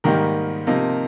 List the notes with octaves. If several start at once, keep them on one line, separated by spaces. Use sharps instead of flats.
G#2 D#3 G3 A#3 D#4 G4 A#4
C3 F3 A#3 D#4